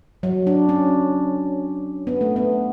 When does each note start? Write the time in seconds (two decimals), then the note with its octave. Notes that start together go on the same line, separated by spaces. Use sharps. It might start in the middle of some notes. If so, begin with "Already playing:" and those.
0.23 F#3
0.47 D4
0.69 C#4
2.07 B3
2.21 A3
2.36 B3